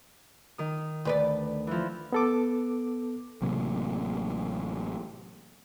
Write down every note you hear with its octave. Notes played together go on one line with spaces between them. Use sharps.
D#3 D#6
D2 B4 D5
E3 F3
B3 A4 D6
A1 C3 F#3 A#3